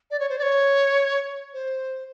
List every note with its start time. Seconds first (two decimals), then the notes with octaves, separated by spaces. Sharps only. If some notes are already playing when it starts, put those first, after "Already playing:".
0.11 D5
0.20 C#5
0.29 C5
0.39 D5
0.42 C#5
1.54 C5